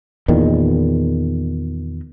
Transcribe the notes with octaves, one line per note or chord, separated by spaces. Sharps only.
E2 A#2 D#3